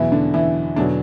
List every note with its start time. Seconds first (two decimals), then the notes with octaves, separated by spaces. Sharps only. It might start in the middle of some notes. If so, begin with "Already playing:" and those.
Already playing: E2 B2 E3 F#3 E4
0.12 D3 D4
0.34 E3 E4
0.76 E2 B2 D3 F#3 D4